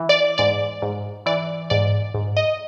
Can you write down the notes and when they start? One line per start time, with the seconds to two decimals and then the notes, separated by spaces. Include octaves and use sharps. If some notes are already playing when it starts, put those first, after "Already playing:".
Already playing: E3
0.09 D5
0.38 G#2 D5
0.82 G#2
1.26 E3 D5
1.70 G#2 D5
2.14 G#2
2.37 D#5